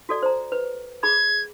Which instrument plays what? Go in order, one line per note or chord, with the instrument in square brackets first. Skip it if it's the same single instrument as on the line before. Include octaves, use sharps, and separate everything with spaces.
[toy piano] F#4 A4 D5
C5 A#5
B4
[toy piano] G#4 B5 D6 [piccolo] G#6